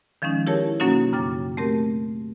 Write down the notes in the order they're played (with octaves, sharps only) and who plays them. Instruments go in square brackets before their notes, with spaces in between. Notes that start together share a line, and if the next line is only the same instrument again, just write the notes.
[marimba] D#3 F3 G#3 C#4 D#4
E4 G4 G#4 A#4 C#5 A5
B2 F#3 A#3 C#4 D#4 F#4
F#2 C#3 G5 D6 A6
A3 C4 G4 A#4